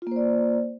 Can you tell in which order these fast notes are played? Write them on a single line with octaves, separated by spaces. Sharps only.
F4 A#3 C5 D5